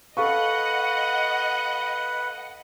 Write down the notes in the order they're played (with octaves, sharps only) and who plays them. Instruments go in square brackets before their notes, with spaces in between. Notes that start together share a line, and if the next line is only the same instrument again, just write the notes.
[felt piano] A4 F5 C#6 [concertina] B4 [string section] D#5 F#5